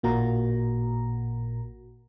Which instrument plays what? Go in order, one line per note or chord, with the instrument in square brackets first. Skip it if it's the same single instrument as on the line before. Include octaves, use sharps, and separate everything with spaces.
[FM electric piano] A1 A#2 A#3 F#4 A#5